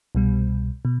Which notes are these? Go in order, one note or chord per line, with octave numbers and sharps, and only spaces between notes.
C2 B2 G3
B2